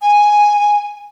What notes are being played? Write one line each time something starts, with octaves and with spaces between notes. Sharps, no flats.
G#5